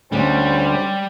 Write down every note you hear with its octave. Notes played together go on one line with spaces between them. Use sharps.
D2 D3 G3 C#4 C5